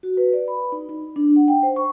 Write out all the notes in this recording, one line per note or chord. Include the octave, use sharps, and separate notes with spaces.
F#4
B4
D5
B5
D#4
D#4
D4
F#5
G5
C5
C#6